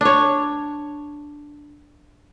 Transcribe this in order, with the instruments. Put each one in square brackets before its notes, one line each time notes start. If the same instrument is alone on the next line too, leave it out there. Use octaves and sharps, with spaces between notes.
[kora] D4 C#5